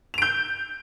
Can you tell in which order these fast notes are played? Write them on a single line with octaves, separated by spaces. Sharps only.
F7 D7 G6